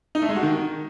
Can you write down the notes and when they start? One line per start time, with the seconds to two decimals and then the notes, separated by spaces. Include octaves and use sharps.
0.15 D#4
0.22 A3
0.29 G#3
0.36 F#4
0.43 D#3